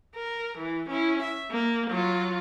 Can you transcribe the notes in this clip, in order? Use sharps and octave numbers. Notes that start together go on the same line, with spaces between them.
A#4
E3
C#4 E4
E5
A#3
F#3 F4